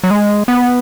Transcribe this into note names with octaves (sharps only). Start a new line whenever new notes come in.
F#3
G#3
B3